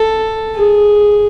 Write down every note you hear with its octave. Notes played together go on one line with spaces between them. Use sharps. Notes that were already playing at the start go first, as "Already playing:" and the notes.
Already playing: A4
G#4